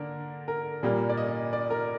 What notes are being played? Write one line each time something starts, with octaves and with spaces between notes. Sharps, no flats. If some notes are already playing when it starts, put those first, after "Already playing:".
Already playing: D3 A#3 D4 A#4
A#4
A#2 G3 A#3
D5
D#5
D5
A#4